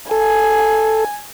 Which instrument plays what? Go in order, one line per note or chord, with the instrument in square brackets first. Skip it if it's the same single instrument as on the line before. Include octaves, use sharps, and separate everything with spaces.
[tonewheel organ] A4 [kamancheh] G#5